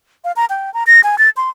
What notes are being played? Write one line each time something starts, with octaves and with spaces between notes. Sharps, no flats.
F5
A#5
G5
A#5
A#6
G#5
A6
C6